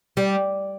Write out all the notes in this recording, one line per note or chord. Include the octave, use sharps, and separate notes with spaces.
G3